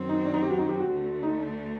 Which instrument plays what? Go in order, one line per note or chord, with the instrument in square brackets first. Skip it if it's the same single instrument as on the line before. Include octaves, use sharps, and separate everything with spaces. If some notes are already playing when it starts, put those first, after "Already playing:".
Already playing: [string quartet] F#2 D#3 F#3 C4
[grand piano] D#4
D4
D#4
G4
F#4
D#4
G4
F#4
[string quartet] D2 D3 A3
[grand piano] D#4